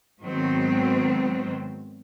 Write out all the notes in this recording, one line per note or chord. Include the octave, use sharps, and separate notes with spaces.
G#2 D#3 F#3 B3 C4